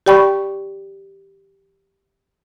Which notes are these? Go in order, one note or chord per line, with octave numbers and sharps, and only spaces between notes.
G4 D5 G5 B5 C#6